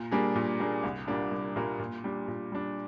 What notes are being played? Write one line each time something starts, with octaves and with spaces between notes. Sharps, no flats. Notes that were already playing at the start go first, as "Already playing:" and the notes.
Already playing: A#2
G3 A#3 D4 G#4
A#2
G3 A#3 D4 G#4
C2
A#2 G3 A#3 D4
C2
A#2 G3 A#3 D4
A#2
G3 D4
A#2
G3 D4